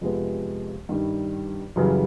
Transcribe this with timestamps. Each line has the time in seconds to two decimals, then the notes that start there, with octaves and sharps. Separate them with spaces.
0.01 F2 C3 F3 G#3 B3
0.89 G2 D#3 G3
1.76 F#2 C#3 E3 G3